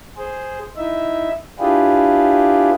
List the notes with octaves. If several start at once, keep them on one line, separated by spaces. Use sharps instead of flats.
G#4 C5
D#4 E4 E5
D4 E4 F4 G4 G#4 B4